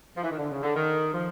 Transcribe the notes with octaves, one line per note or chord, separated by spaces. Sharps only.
F3
E3
D#3
D3
C#3
D3
D#3
F3